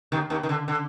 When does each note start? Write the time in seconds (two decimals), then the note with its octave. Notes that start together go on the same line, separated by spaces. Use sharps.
0.12 D#2 D#3
0.30 D#2 D#3
0.43 D#3
0.49 D3
0.68 D3